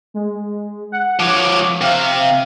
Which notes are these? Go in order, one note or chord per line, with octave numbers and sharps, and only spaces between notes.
G#3
F#5
F3 C#5 D6
C3 F5